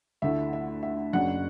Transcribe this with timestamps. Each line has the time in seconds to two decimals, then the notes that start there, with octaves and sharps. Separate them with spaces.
0.22 D2 D3 A3 E4 E5
0.53 E5
0.83 E5
1.13 F#1 F#2 F#3 D4 F#5